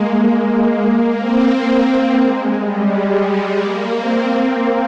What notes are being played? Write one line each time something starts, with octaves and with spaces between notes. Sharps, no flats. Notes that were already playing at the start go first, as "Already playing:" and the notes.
Already playing: G#3 A#3
G#3
A#3
C4
C4
G#3
G3
G#3
A#3
C4
C4